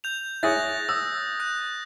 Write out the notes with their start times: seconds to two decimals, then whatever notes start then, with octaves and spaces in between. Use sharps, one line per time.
0.04 G6 F7
0.43 E4 G#4 C#5 F#6 A6 A#6
0.89 D#6 E6
1.40 F#6